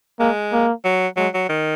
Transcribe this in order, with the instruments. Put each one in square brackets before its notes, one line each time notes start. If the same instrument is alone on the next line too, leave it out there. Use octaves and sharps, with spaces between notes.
[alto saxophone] G#3 [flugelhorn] A#3
[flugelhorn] A#3
[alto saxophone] F#3
[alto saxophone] F#3 [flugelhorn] G#3
[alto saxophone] F#3
D#3